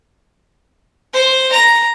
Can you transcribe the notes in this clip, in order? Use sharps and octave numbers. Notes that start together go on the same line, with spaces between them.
C5
A#5